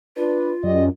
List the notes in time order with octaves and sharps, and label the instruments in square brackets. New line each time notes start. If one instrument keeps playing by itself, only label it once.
[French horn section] D4 B4 [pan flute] F4
[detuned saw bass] F#2 [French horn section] G4 D5 D#5